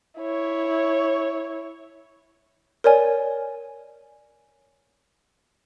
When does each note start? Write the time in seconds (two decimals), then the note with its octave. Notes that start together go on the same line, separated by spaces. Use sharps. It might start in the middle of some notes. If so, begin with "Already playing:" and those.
0.18 E4 C#5
2.84 A#4 C#5 D5 G#5